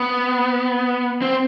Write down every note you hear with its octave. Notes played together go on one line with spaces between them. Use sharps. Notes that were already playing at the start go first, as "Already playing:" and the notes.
Already playing: B3
C4